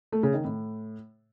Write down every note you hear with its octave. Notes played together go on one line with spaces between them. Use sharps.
A3
C#3
D#3
A2